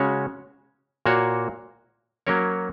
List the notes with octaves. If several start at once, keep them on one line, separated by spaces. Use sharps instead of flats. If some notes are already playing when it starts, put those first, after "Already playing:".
Already playing: C#3 G#3 C#4 F#4 C#5
A#2 A#3 F#4 C#5
F#3 A#3 C#4 A#4 C#5